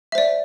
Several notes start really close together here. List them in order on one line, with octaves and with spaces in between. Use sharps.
E5 C5 D5